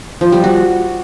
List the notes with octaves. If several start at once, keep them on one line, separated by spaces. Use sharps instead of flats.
F3
G3
F#4